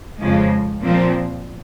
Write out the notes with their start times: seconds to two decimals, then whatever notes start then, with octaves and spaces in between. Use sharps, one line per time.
0.19 F2 C#3 F3 G#3
0.82 A#2 F3 C4